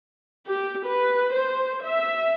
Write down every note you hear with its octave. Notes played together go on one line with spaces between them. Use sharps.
G4
B4
C5
E5